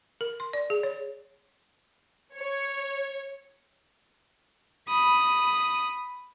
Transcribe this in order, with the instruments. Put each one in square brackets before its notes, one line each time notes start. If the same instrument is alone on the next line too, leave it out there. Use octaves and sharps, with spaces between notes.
[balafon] A#4
C6
D5
G#4
C#5
[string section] C#5
[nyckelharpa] B5 [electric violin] D#6